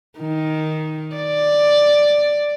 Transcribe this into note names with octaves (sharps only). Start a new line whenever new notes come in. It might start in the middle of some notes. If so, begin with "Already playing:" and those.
D#3
D5